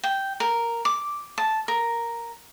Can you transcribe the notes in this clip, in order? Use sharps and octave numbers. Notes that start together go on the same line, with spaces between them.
G5
A#4
D6
A5
A#4